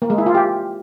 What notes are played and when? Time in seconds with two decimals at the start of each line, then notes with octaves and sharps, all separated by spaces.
0.02 A#3
0.10 G#3
0.18 E4
0.26 F4
0.34 G4